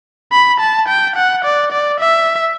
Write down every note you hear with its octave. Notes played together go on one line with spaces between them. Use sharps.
B5
A5
G5
F#5
D5
D5
E5